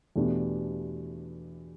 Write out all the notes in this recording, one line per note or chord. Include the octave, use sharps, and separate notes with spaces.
E2 B2 A3 D4 G4